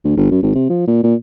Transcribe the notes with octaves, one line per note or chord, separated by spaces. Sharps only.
D2
G1
F#2
G#1
C3
F3
A#2
A#2